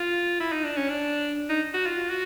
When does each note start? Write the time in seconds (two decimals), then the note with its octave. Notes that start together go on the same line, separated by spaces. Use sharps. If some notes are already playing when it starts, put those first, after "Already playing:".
Already playing: F4
0.40 E4
0.52 D#4
0.64 D4
0.77 C#4
0.89 D4
1.49 D#4
1.74 F#4
1.86 F4
2.10 F#4